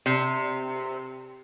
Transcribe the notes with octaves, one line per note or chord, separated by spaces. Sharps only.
C3